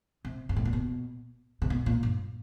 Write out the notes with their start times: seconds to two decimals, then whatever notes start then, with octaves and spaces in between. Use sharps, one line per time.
0.25 C3
0.49 G#2
0.56 A2
0.65 A#2
0.73 B2
1.62 C3
1.70 B2
1.86 A#2
2.03 G2